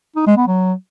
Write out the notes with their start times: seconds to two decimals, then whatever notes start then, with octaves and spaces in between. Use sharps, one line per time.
0.16 D#4
0.27 G#3
0.37 B3
0.47 F#3